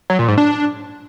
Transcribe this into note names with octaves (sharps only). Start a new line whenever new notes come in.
F#3
A#2
G#2
D4